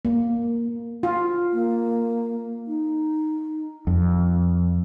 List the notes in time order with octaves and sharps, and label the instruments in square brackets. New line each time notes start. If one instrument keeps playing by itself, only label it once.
[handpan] A#3
[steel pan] F4
[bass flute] A#3
D#4
[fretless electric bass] F2